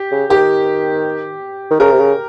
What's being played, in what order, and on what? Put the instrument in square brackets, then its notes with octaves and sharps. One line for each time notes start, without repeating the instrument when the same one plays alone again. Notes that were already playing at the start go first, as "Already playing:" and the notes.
Already playing: [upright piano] G4
[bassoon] C#3
[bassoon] D#3 [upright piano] G4
[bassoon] D#3
[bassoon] C#3 [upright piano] A#4
[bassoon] C3
C#3